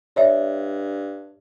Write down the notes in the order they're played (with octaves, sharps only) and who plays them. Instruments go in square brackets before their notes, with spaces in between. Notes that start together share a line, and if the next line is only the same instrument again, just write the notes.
[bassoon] G2 [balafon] C#5 D5 E5